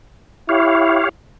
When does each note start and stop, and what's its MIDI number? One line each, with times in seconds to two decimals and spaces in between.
0.49 1.03 64
0.49 1.09 67
0.49 1.09 73
0.49 1.09 77